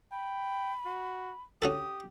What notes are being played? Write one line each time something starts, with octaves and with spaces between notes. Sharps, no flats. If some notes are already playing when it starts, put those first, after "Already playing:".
G5 B5
F#4
C#4 F#4 G4 A4 D#6